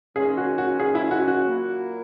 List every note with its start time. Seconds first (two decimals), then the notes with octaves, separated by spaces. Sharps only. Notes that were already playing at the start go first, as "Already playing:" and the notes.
0.16 D#3 G#3 C#4 G#4
0.37 F#4
0.58 F#4
0.80 G#4
0.95 E4
1.11 F#4
1.28 F#4
1.43 A#2 F#3 A#3 E4